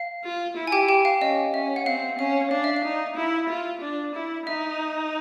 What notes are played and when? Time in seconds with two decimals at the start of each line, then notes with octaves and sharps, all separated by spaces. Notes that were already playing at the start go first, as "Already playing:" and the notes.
Already playing: F5
0.24 F4
0.57 E4
0.67 G#5
0.72 G4 G5
0.89 G4 G5
1.05 F5
1.21 C#4 D#5
1.54 C#4 E5
1.76 F#5
1.86 C4 F5
2.18 C#4 F5
2.51 D4 F5
2.64 E5
2.76 F5
2.84 D#4
3.17 E4
3.49 F4
3.82 D4
4.15 E4
4.47 D#4 E5